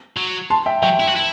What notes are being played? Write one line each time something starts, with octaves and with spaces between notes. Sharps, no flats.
F#3
A5 C6
E5 G5
F#3 E5 G5
E4
F#4
E4